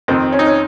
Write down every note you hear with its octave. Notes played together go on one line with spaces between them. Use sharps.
F2 D#3 C4
C#4
D#4
C#4